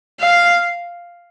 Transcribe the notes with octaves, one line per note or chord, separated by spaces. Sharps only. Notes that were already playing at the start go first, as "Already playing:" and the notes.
F5